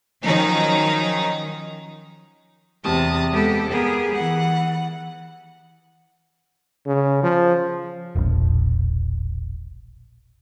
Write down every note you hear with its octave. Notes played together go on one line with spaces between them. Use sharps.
D#3 F3 F#3 C#4 D#4
E2 C3 A5 D#6
G#3 B3 G4 A4
B3 G4 G#4 A#4
E3 F#5
C#3
F3
E1 A#1